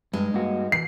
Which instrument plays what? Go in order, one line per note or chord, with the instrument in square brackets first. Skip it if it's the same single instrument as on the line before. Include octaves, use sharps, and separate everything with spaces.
[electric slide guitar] G2 [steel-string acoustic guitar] G#3 D#4
[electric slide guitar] G2 F#4 [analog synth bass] A#3
[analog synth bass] E3 [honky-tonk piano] C7